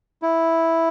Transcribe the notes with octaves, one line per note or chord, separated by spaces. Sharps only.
E4